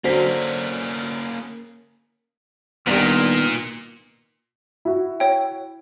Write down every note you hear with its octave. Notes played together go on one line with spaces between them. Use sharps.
D3 F#3 A#3 C#4 C5 B6
C2 A#2 D#3 B3 D4 G4
E4 F#4
C#5 G5